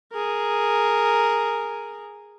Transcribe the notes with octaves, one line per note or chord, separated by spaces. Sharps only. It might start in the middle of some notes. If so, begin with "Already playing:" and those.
G#4 A#4